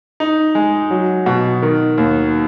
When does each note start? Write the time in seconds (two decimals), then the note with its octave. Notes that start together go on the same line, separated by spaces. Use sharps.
0.20 D#4
0.55 G#3
0.91 F#3
1.26 B2
1.62 D#3
1.98 D#2